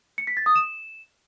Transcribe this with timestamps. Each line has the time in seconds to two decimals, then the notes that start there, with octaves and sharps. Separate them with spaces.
0.18 C#7
0.27 B6
0.37 A6
0.46 D#6
0.56 E7